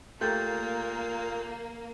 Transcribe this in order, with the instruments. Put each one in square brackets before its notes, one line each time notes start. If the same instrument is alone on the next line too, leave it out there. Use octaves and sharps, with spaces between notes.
[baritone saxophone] A#2 [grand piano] A3 G4 [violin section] A#3 [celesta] G6 A6